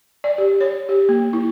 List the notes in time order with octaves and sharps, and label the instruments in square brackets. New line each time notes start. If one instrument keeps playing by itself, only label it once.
[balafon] D5
G4
C#5
G4
A#3
E4